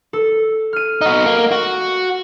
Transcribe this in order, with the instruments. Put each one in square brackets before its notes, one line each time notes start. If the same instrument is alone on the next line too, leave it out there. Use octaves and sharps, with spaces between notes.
[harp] A4
F6 D#7
[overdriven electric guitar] D#4 F#4
A#3
F#4